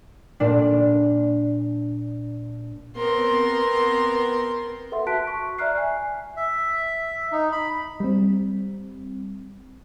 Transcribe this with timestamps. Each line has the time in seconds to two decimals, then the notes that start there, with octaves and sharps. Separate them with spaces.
0.40 A#2 D4
2.97 B3 C4 A#4 C6
4.92 A4 B4 E5 F#5 C6
5.07 F#4 A5 F#6 B6 D7
5.27 C#6
5.59 D5 E5 A#5 F6 F#6 C7
5.78 G#5
6.37 E5
7.32 D#4
7.52 B5
8.00 G3 C4